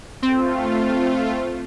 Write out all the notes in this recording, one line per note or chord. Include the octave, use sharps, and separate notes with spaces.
A3 C4 F4